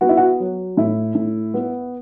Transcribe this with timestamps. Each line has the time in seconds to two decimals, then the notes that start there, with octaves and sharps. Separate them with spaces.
0.01 B3 F#4
0.09 E4
0.17 F#4
0.40 F#3
0.77 A2 E4
1.15 A2
1.54 B3